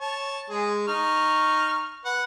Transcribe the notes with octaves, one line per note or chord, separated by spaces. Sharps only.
C#5 A5 C#6
G#3 G#4
D#4 C#6 F6
B4 F#5